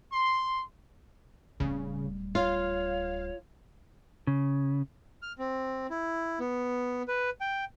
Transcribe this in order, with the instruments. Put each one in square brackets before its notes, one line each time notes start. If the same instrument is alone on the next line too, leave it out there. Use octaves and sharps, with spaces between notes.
[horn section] C6
[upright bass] D1 G3 [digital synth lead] C#3
[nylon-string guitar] F4 [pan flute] C#5 [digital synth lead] F5
[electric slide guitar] C#3
[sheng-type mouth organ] F6
C4
E4
B3
B4
G5